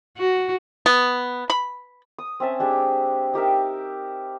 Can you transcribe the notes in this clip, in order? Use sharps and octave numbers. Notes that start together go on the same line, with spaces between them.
F#4
B3
B5
D#6
C4 C#4 E5 A5
G#3 D4 G4 G#4
D#4 G4 A#4 E5